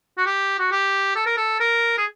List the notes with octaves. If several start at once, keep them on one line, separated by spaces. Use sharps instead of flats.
F#4
G4
F#4
G4
A4
A#4
A4
A#4
G#4